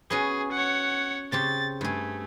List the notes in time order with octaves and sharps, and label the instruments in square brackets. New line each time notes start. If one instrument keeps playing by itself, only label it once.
[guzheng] B3 C#4 F#4 [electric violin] G#4
[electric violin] C#5 F#5
[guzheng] C#3 C4 G4 [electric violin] A6
[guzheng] G2 G#4 [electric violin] A3